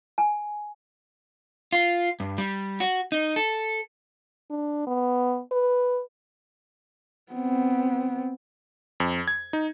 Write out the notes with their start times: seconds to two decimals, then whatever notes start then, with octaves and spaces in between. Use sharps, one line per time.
0.18 G#5
1.72 F4
2.20 G2
2.38 G3
2.80 F#4
3.12 D#4
3.36 A4
4.50 D4
4.87 B3
5.52 B4
7.32 B3 C4
9.00 F2
9.28 G#6
9.53 D#4